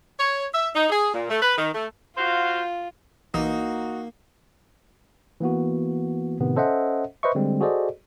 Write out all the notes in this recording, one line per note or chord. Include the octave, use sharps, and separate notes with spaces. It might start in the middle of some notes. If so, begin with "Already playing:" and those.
C#5
E5
D#4
G#4
A#2
A3
B4
D#3
A3
F4 F#4 C5 F5
B1 E3 A#3 D#4 F#4 D#6
E3 A#3 B3 F#4
A2 C3 D#3 B3
C#4 A4 C5 D#5 E5 F#5
B4 C5 D#5 E5 C#6
D3 G3 G#3 C4
F#4 G#4 A4 C5 D5 D#5